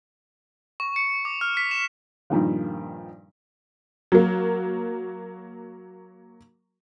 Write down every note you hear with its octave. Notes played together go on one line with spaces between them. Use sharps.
C#6
C#7
D6
F6
B6
E7
G2 A#2 D#3 F3
F#3 A#3